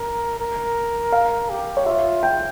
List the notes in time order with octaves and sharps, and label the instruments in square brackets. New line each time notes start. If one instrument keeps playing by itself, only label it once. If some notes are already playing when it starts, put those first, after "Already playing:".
Already playing: [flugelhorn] A#4
A#4
[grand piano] F5
[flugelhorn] G4
[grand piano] C#5
[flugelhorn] F4 [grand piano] E5
[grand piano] G5